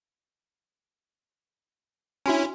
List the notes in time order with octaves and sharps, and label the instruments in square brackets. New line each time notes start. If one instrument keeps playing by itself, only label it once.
[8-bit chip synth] C#4 E4 [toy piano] D4 F#4 G#5